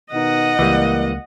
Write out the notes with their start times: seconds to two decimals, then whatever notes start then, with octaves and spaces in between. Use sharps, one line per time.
0.12 B2 D#3 D#4 D#5 F#5
0.59 C#2 E3 G3 A#3